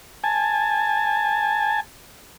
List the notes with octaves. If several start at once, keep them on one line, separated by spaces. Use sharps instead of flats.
G#5 A5